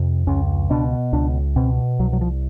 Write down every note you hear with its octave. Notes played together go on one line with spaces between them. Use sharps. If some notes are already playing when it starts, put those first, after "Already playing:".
Already playing: F2 C3
C#2 C#4
B2 D4
C#2 D4
B2 C4
C2 F#3
F#3
F3